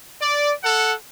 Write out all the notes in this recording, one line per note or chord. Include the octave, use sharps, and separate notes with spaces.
D5
A4 F#5